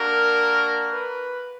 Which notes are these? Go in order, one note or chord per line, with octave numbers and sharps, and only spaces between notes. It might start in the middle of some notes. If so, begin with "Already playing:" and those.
Already playing: A#3 D4 F#4 A#4
B4